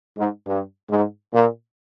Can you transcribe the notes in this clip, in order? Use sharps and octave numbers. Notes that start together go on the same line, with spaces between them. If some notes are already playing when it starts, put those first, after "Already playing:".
G#2
G2
G#2
A#2